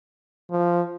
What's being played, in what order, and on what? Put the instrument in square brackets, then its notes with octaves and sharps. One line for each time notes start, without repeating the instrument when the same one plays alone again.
[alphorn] F3